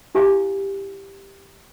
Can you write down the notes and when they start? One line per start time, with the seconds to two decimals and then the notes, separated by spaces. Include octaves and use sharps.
0.15 E4 G4 F5 G#5